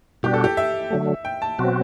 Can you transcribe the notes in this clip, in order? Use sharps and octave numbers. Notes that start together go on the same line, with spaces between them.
B2 G3 D4 F#4 G4
A4
G4
E5
D3 F#3 A3
G5
A5
B2 F#3 C4 F#4